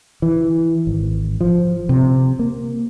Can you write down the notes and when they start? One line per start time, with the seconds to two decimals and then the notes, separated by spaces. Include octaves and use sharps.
0.22 E3
0.87 G#1
1.41 F3
1.89 C3
2.39 A#3